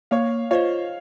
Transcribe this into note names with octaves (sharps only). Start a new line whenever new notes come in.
A#3 C#5 F5
F4 C5 C#5 D#5 F5